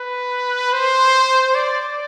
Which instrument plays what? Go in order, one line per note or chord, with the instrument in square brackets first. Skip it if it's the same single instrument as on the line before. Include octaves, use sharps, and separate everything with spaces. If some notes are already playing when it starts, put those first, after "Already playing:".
Already playing: [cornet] B4
C5
D5